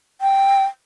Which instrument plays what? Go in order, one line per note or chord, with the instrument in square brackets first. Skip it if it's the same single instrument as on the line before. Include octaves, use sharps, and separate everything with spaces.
[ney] G5